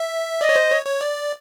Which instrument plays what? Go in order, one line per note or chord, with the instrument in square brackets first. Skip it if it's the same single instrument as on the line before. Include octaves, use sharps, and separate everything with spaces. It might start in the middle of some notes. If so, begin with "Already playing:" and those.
Already playing: [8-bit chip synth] E5
[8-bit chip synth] D5 [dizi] D#5
[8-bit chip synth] C#5
C5
C#5
C#5
D5